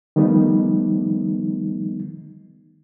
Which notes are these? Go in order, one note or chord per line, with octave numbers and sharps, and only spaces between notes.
D#3 F3 G3 A3 B3 D#4